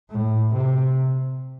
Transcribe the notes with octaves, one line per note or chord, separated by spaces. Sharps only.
A2
C3